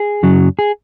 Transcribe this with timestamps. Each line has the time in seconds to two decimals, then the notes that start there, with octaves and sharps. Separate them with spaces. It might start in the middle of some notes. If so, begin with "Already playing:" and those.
Already playing: G#4
0.23 F#2 C#3 F#3
0.59 G#4